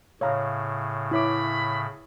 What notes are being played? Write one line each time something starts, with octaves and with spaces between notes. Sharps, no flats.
A2 C#3 C#5 F5 A#5
E4 C#5 B5 D6